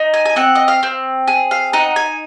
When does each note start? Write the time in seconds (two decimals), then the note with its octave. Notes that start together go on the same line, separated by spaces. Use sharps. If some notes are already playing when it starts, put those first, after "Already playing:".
Already playing: D#4
0.14 G#5
0.25 G#5
0.36 C4 F#5
0.55 D#5
0.68 F5
0.83 C4
1.28 G#4
1.51 F5
1.73 D#4 F#5
1.96 G#5